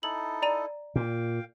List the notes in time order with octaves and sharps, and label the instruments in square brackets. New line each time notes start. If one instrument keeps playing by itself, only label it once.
[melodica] D#4 E4 A4 [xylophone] F#7
[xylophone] D5 A#5 D#7
[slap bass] A#2 [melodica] F5 G5